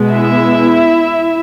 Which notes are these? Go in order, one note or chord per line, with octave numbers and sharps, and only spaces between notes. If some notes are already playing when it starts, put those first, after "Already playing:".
Already playing: B2 G#3 B3
E4 E5